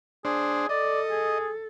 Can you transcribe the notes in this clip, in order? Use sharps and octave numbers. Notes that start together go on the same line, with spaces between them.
D4 G#4 C5
A4 D5 D#5
G#4